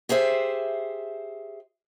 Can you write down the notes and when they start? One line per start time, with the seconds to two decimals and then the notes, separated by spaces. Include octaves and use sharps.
0.09 G4 G#4 C5 E5